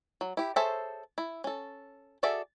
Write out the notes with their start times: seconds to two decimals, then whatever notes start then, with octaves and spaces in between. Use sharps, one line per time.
0.21 F#3
0.37 E4 G4
0.56 G#4 A4 C5 C#5 E5
1.18 E4
1.44 C#4 A4
2.23 F#4 G#4 A4 D5 E5